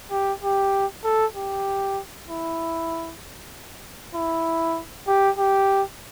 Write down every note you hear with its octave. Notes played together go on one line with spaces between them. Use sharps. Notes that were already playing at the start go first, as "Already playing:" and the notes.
G4
G4
A4
G4
E4
E4
G4
G4